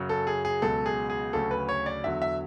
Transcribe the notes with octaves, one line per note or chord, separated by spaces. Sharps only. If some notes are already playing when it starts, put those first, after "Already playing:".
Already playing: F#2 C#3 F#3
A4
G#4
G#4
C#2 B2 F#3 A4
G#4
G#4
D2 C#3 F#3 A4
B4
C#5
D5
E2 D3 F#3 E5
E5